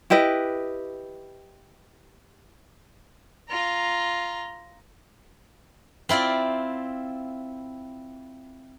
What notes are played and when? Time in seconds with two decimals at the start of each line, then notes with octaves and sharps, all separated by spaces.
0.10 E4 G4 B4 D#5
3.50 F4 A#5
6.09 C4 E4 F4 D5